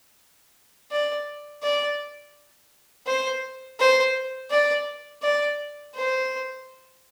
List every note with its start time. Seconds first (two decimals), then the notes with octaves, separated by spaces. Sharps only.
0.91 D5
1.63 D5
3.07 C5
3.80 C5
4.50 D5
5.22 D5
5.95 C5